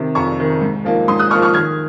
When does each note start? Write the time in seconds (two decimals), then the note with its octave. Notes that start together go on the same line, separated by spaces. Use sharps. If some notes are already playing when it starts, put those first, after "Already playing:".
Already playing: C3 D#3
0.15 F2 A#5 C#6
0.38 C3 D#3
0.61 G#2
0.85 F3 A#3 D#4
1.08 G#2 C6 D#6
1.19 D#6 F#6
1.31 F3 A#3 D#4 C#6 F6
1.42 C#6 F6
1.54 D#3 F6 G#6